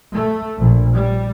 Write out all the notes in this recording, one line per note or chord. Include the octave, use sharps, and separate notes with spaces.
A3
A#1
G3